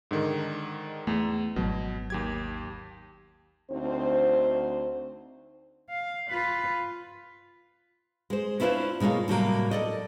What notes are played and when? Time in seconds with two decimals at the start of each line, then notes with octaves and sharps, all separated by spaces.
0.11 G#2 D3 D#3
1.07 E2 A3
1.56 G#1 B2 F#3
2.10 D#2 G4 G#6
3.71 D2 C4 D#4 C5
5.90 F5
6.30 F4 B4
8.30 G#3 C5
8.60 C#4 D4 E4 F4 B4 C5
9.00 B2 G#3 A#3 F4 C#5
9.28 A2 C3 F#3 G3 A3 A#3
9.71 A4 D5 D#5